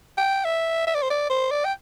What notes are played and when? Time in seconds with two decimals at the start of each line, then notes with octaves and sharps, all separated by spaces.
0.18 G5
0.45 E5
0.87 E5
0.95 D5
1.03 C5
1.10 D5
1.30 C5
1.51 D5
1.65 G5